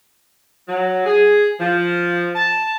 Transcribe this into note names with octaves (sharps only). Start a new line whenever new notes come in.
F#3
G#4
F3
A5